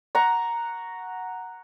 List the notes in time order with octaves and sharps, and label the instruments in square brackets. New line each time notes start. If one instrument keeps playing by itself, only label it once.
[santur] F#5 A#5 C#6